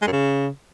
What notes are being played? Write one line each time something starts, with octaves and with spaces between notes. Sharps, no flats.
G#3
F#2
C#3